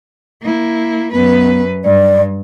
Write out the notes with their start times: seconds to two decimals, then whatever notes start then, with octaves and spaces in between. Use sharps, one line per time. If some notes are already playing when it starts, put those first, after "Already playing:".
0.42 A#3 E4
1.13 F#2 B3 B4
1.85 G2 D5